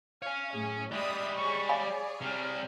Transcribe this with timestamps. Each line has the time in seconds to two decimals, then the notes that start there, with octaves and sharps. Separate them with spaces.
0.22 C#5 F5 G#5
0.53 F#2 A2 G#4
0.92 G3 G#3 D5 E5 B5 D#6
1.36 G#4 C#5 C#6
1.69 D5 F5 G#5 B5
2.22 C3 G3 F6